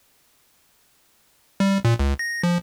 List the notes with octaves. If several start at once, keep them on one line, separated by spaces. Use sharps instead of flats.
G3
A#2
C#2
A#6
F3